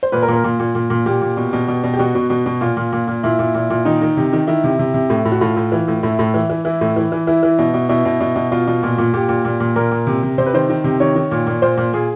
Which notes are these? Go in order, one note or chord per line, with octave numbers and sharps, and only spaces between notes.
C5
A#2 B4
A#4
A#2
A#4
A#2
A#2
A#2
A#2
A#2 G4
A#2
B2
B2
B2
B2
G4
B2 F#4
B2
B2
B2
A#2 F4
A#2
A#2
A#2
A#2 E4
A#2
A#2
A#2
D#3 D#4
D#3
C3
D#3
D#3 E4
C3
C3
C3
A2
A2
F#4
A2 F4
A2
E3
A2
A2 E4
A2
E3
E3
E3 E4
A2
E3
E3
E3 E4
E3
B2
B2
B2 E4
B2
B2
B2
B2 F4
B2
A#2
A#2
A#2 G4
A#2
A#2
A#2
A#2 A#4
A#2
C3
C3
C3 C5
B4
D#3 C5
D#3
C3
D#3 C#5
D#3
A#2
A#2
A#2 C5
A#2
A#2 G#4